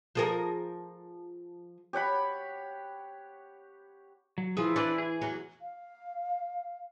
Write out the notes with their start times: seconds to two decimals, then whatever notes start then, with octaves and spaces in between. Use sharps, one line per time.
0.15 F3 G#4 A#4
1.93 G4 C#5 F#5 B5
4.38 F#3
4.57 E3 F3 E4 F4 G#4
4.76 E3 D4 B4 C5 D5
4.98 G#4 G#5
5.21 E2 F#3
5.62 F5